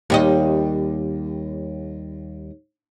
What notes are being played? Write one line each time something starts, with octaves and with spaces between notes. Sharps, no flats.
D#2 G3 D#5